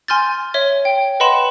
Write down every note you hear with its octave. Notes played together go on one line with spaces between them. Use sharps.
G#5 C6 F6 G6 A6
C#5 E5 G7
G5
B4 D#5 F#5 B5 C6 E7